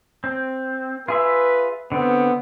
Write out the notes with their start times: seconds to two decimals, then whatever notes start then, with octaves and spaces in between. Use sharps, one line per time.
0.24 C4
1.08 F4 G#4 B4 E5
1.92 D3 B3 C4